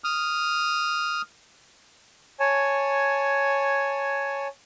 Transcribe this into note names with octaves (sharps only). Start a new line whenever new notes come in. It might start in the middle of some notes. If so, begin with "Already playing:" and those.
D#6 F6
C#5 G#5 A5